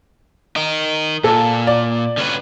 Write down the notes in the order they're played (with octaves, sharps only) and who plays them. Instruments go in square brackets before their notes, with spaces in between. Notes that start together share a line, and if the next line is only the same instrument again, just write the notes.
[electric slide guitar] D#4 A#4
[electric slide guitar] A#2 [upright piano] A4
[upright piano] D5
[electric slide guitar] D3 C#4 B4